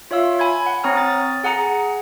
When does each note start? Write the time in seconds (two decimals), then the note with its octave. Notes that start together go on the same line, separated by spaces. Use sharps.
0.11 F4 C#5 E5 F5 E6
0.39 G#5 B5 G#6
0.66 F#5
0.84 C4 C#5 A#5 D#6 F6
0.95 D#6 A6
1.44 G#4 F#5 G#5 A#5 C#7